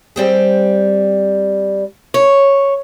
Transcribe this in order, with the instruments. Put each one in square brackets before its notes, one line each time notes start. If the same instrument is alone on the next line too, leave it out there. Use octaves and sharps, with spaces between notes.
[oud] G3 C4 G#4
[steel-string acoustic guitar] C#5